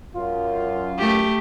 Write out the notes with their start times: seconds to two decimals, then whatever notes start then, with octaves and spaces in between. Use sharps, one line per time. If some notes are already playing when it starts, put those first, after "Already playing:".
0.16 F#2 F4
0.98 A3 G4